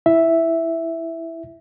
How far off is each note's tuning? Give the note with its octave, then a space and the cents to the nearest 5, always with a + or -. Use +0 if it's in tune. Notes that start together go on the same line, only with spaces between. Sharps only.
E4 +0 E5 +0